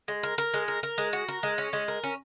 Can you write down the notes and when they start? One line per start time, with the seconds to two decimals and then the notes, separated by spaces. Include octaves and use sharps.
0.08 G#3
0.23 A#4
0.38 A#4
0.54 G#3
0.68 A#4
0.83 A#4
0.98 G#3
1.13 F#4
1.28 A#4
1.43 G#3
1.58 C#4
1.73 G#3
1.88 A#4
2.04 C#4